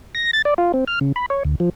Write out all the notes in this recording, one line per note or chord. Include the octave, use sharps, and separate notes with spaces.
A#6
A6
D5
F4
C4
F6
C#3
B5
C#5
D2
F3